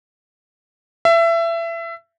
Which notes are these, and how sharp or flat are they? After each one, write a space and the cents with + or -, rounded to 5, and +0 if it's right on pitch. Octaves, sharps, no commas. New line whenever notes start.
E5 +25